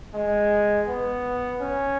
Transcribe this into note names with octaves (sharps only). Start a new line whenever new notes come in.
G#3
B3
C#4